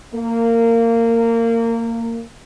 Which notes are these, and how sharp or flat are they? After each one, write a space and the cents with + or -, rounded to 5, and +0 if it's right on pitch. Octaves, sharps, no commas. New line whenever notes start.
A#3 -20